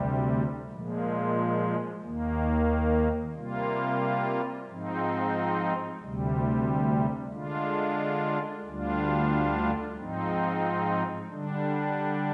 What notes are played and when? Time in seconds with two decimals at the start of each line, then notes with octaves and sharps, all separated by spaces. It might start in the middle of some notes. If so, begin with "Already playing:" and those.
Already playing: D2 C3 G3
0.70 A#2 F3 G#3
2.02 D#2 D#3 A#3
3.35 C3 G3 A#3 F4
4.67 G#2 F3 C4 D#4
6.01 D2 C3 G3
7.33 D3 G#3 D4 F4
8.65 D2 D3 G3 D4 F4
9.97 G#2 F3 C4 D#4
11.30 D3 G3 D4